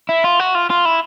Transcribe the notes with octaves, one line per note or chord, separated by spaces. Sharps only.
E4
F4
F#4
F4
F4
E4